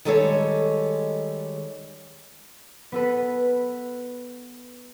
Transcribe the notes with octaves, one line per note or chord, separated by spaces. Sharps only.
D#3 G3 G#3 A4 C5 C#5
B3 A4 B4